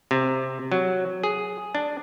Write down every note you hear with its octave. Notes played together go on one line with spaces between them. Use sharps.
C3
F#3
G#4
D4